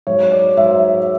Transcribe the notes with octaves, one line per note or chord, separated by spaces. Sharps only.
G#2 F#3 C#5
D5
G#2 F#3 E5